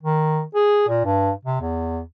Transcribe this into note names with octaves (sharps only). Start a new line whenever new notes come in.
D#3
G#4
A#2
G2
C3
E2